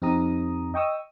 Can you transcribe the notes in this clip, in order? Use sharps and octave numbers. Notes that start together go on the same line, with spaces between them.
F2 C4 D#4 G4 A#5 D#6
D#5 G5 C#6 D#6 E6